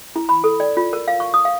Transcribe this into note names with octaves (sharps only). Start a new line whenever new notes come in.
E4
B5
A4
D5
F4
A#4
F5
C#6
D#6
F5